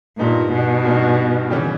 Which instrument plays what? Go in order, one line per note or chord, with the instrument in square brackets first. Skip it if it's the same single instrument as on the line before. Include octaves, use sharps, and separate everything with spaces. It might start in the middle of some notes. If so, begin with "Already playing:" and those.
[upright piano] G2 G3 B3 D#4 [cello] A#2
[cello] B2
[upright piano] G2 G3 B3 D#4
C#3 E3 G3 C#4 G4